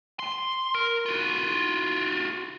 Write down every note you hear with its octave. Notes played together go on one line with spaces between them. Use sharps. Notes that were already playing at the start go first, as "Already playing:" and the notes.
C6
A#4
F4 F#4